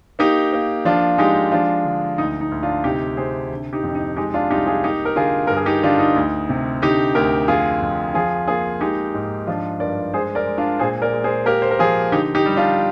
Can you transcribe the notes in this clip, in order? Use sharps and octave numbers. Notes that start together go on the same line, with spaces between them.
A#3 D#4 G4
A#3
F3 D4 F4
G#3 D#4 G4
F3 D4 F4
D3
D2 D#4
D#4
D2
D4 F4
C3 D#4 G4
C3 G#4 C5
D3
D#4 G4
F2
D#4
G#3 D#4 G4
D4 F4
C2 D#4 G4
F4 G#4
A#3 D#4 G4
A#4
D3 F4 G#4
G2 A#4
G#4
D#4 G4
D3 D4 F4
D#4
D2
C3
D3 D#4 G4
D2 G4 A#4
F2 F4 G#4
F2
F3 F4 G#4
A#3 F4 G#4
G#3 D#4 G4
G#2
F3 D4 F4
G2 A#4 D5
G#3 G#4 C5
A#4 D5
G#3
D4 F4
A#2 G#4 C5
A#4 D5
G#3
G#4 C5
A#3 G4 A#4
C5
A#4
F3 F4 G#4
D3 D#4 G4
D#4 G4
G3
D4 F4